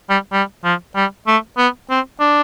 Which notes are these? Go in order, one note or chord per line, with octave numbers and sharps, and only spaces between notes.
G3
G3
F3
G3
A3
B3
C4
D4